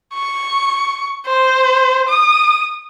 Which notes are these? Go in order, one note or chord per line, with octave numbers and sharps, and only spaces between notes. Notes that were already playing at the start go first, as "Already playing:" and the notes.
C#6
C5
D#6